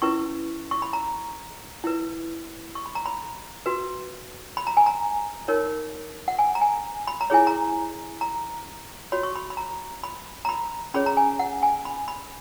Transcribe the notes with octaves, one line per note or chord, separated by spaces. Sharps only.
C#4 E4 B4 C#6
C#6
B5
A#5
E4 B4
C#6
B5
A#5
B5
F#4 B4
B5
A#5
G#5
A#5
D#4 A#4 C#5
F#5
G#5
A#5
G#5
B5
A#5
E4 G#4 C#5 G#5
A#5
A#5
F#4 C#5 B5
C#6
B5
B5
A#5
B5
A#5
B5
C#4 G#4 C#5 B5
A#5
G#5
F#5
G#5
B5
B5